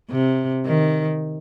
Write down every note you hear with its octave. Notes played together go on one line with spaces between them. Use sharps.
C3
D#3